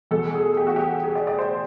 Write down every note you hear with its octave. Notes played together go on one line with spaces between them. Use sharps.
E2 B2 A4
G#4
G4
F#4
G4
G#4
D5
D5
C5